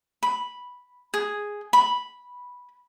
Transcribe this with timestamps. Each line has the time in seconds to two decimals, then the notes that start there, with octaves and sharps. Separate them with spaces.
0.23 B5
1.14 G#4
1.73 B5